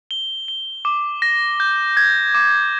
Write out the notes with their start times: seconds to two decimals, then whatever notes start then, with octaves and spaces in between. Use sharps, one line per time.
0.11 G7
0.48 G7
0.85 D6
1.22 A#6
1.60 G6
1.97 G#6
2.34 D6